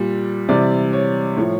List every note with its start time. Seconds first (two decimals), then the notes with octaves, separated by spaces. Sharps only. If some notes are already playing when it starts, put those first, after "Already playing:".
Already playing: A#2 G3
0.48 C3 E3 G3 D5
0.93 C#5
1.37 A2 F3 C#5